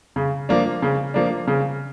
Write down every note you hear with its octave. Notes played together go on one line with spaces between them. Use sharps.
C#3
F3 A#3 D4
C#3
F3 A#3 D4
C#3